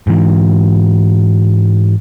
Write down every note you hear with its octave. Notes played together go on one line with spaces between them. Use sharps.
G#2 E3